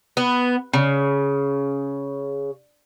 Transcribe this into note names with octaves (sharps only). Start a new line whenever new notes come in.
B3
C#3